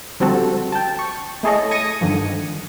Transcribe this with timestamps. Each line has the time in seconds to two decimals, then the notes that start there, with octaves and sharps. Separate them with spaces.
0.20 D3 F3 G3 C4 F#4 A4
0.72 G5 A5
0.99 C#6
1.43 A3 E4 G#4 A4 C#5 D#5
1.71 D#6 G#6 A#6 C#7 D#7
2.01 G2 D3 D#3 F3